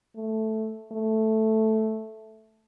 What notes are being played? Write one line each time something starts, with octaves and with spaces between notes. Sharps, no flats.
A3
A3